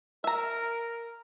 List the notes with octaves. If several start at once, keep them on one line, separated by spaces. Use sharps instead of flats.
A#4 E5 A#5